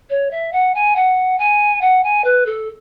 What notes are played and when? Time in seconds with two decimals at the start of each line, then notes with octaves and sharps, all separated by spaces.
0.10 C#5
0.31 E5
0.53 F#5
0.75 G#5
0.96 F#5
1.38 G#5
1.81 F#5
2.04 G#5
2.24 B4
2.46 A4